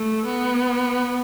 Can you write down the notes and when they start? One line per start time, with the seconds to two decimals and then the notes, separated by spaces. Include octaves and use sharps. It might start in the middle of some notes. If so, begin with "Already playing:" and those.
Already playing: A3
0.26 B3